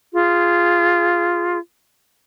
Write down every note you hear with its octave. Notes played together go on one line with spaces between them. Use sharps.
F4 G#4